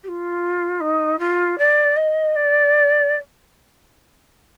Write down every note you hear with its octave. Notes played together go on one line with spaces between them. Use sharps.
G4
F4
D#4
F4
D5
D#5
D5